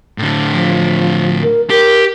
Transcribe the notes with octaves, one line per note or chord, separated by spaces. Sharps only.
A2 D3
F3
A#4
G4 A#4